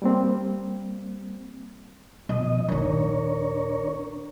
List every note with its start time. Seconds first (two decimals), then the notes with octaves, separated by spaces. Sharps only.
0.02 G3 A#3 C4
2.29 B2 F3 D#5
2.69 A#1 D#2 D4 A#4 C#5